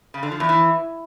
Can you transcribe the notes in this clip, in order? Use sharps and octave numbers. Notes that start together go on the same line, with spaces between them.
C#3
D3
F3
E2
E3